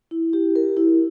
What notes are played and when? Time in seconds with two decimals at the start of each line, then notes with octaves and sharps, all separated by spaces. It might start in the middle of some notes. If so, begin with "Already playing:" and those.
0.11 E4
0.33 G4
0.56 A#4
0.77 E4